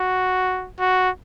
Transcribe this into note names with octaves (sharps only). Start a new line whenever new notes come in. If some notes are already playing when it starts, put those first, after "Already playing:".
Already playing: F#4
F#4